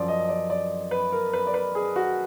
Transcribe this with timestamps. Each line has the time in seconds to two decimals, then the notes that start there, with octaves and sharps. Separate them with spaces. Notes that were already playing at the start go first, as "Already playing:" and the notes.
Already playing: F#2 F3 D5
0.08 D#5
0.29 D5
0.50 D5
0.91 B4
1.12 A#4
1.33 B4
1.47 D5
1.54 B4
1.75 G#4
1.96 F#4